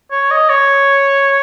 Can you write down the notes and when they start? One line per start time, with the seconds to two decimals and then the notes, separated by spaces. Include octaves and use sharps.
0.11 C#5
0.31 D#5
0.50 C#5